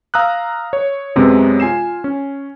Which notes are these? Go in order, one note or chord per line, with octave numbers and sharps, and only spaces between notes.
F5 A#5 D#6 E6 F#6
C#5
F#2 C3 G#3 B3
F4 G#5 C7 E7
C#4